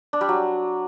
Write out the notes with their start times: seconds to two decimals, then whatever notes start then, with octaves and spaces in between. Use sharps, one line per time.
0.13 D4
0.21 G3
0.29 F#3